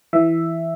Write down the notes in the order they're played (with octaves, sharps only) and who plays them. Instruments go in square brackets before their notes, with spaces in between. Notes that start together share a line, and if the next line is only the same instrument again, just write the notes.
[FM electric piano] E3 E5